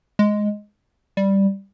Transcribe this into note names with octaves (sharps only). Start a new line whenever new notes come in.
G#3
G3